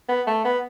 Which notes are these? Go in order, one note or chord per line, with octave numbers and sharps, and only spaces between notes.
B3
A3
B3